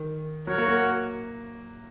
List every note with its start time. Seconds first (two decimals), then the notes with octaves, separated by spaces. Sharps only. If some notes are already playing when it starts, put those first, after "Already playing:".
Already playing: D#3
0.47 F#3 F#4 A#4 C#5 F#5
0.58 A#3
0.68 A#3